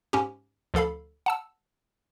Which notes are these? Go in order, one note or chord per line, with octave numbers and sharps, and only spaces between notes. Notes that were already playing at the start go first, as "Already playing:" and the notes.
G#2 C#4 G4
D2 F3 A4 F5 B5
F#5 A5 E6